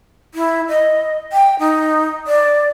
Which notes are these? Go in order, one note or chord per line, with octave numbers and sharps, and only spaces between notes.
E4
D#5
G5
D#4
D5